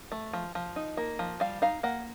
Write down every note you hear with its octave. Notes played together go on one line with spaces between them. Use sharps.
A3
F3
F3
D#4
A#3
F3
G3 F5
D#4 F5
A#3 F#5